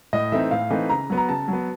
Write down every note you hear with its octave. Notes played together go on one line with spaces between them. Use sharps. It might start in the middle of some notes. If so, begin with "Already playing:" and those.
A2 D#5
E3 A3 C4 D#4 E5
A2 F5
E3 A3 C4 D#4
C#3 A#5
F#3 B3
A#5
C#3 A5
F#3
B3